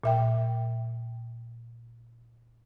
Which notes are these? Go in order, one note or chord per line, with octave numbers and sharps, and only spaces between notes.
A#2 E5 G5